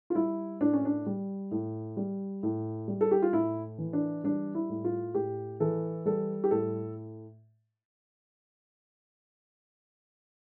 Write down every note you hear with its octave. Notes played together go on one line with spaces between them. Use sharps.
F4
G3 E4
A2 D4
C#4
D4
G3
A2
G3
A2
G3
A4
G4
F4
A2 E4
E3
D4
G3 D4
E4
A2
F4
A2 G4
E3 A4
G3 A4
G4
A2 A4